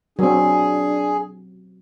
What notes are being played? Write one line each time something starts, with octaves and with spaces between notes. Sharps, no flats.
F#3 C4 D4 G#4